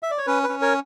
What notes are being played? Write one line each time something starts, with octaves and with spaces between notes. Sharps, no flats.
E5
D5
C#5
C#4 B4
B4
C#4
A#4 C#5